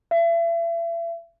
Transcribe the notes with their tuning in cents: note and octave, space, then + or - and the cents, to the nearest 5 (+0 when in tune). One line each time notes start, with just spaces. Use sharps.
E5 +35